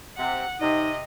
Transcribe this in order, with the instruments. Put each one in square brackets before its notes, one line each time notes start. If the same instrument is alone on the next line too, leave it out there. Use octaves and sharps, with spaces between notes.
[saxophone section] C3 [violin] F#5
[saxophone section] C3 [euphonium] D#4 [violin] D#5